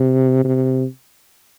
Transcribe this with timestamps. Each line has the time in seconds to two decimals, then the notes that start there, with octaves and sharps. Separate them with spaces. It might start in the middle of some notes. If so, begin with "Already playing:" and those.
Already playing: C3
0.44 C3